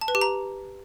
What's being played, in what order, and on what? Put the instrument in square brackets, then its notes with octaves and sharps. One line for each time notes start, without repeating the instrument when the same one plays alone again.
[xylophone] A5
B4
G4
A#5